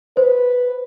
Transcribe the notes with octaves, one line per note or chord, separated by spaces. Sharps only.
B4 C5